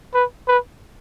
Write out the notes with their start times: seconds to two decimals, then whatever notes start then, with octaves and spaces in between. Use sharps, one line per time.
0.14 B4
0.48 B4